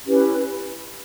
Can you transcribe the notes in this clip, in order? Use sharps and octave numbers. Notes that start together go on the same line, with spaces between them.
C#4 E4 G4 B4